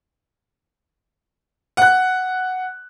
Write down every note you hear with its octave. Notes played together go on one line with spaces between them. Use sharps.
F#5 F#6